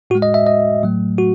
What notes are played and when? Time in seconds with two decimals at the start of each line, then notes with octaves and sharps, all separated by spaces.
0.10 A2 F#4
0.15 G#3
0.22 D#5
0.34 E5
0.46 D#5
0.83 A2 F#3 A3
1.18 F#4